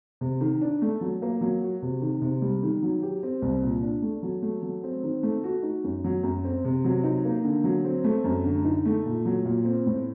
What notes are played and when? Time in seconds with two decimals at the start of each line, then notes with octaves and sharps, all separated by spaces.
0.21 C3
0.41 D#3
0.61 D4
0.82 A3
1.01 F#3
1.22 A#3
1.41 F#3
1.62 F#4
1.82 C3
2.02 D#3
2.22 C3
2.42 G3
2.63 D#3
2.82 F#3
3.02 G4
3.23 C4
3.42 C2
3.63 A#2
3.83 D4
4.02 A3
4.23 F#3
4.42 A3
4.63 F#3
4.84 C4
5.03 D#3
5.23 A3
5.44 F#4
5.63 D#4
5.84 F#2
6.04 F#3
6.23 F#2
6.45 C4
6.65 C3
6.84 F#3
7.04 D#4
7.25 A#3
7.44 D3
7.64 F#3
7.84 C4
8.04 A3
8.24 F#2
8.45 D3
8.65 D#4
8.85 A3
9.06 A#2
9.26 F#3
9.45 A#2
9.65 C4
9.86 A2